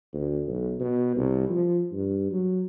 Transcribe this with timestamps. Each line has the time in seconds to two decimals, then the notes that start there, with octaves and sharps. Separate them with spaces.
0.14 D2
0.48 B1
0.80 B2
1.16 C2
1.49 F3
1.92 G2
2.31 F#3